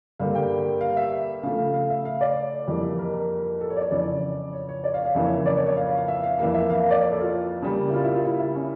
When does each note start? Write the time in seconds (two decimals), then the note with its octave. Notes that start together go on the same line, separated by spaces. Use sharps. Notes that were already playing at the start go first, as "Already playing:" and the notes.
0.19 G2 D3 G3 A#3 F5
0.35 G5
0.81 F5
0.97 E5
1.43 C#3 F3 A3 F5
1.58 F5
1.74 F5
1.90 E5
2.05 F5
2.21 D5
2.68 F2 E3 G3 A#3
2.99 A#4
3.13 A#4
3.61 A4
3.70 C#5
3.77 D5
3.81 C#5
3.91 F2 C#3 E3 D5
4.53 C#5
4.69 C#5
4.84 D5
4.94 F5
5.05 F5
5.15 F2 C#3 E3 A#3 E5
5.25 C#5
5.46 D5
5.56 C#5
5.66 C#5
5.77 F5
5.87 F5
5.97 F5
6.08 E5
6.23 F5
6.39 F2 E3 A#3 E5
6.54 E5
6.70 F5
6.80 F5
6.91 D5
7.01 C#5
7.11 A4
7.21 F4
7.62 C#3 G3 A#3
7.89 E4
7.94 F4
8.04 E4
8.14 F4
8.25 E4
8.40 E4
8.55 C#4